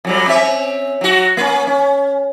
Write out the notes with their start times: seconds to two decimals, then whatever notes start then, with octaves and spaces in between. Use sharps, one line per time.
0.05 F2 F#3 G3
0.27 C4 C#4 E5
1.01 F#3 F#4
1.37 A#3 C#4
1.67 C#4